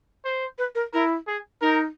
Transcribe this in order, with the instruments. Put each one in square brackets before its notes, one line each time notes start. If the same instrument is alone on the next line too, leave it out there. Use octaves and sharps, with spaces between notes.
[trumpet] C5
[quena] B4
A#4
[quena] E4 [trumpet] A#4
[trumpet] G#4
[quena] D#4 [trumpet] A#4